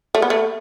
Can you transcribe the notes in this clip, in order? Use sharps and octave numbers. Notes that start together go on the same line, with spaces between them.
A3
B3
A3